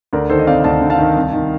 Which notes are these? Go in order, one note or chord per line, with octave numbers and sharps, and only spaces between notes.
D2 A#4 D5
D#3 A4 C5
D#5
C3 D5 F5
D2 F5 A5
D2
F5 A5
D#3
C2
D#3